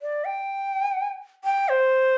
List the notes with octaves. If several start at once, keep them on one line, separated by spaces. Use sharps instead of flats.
D5
G5
G5
C5